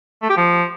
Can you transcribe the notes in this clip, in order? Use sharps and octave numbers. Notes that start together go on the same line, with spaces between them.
A3
G4
F3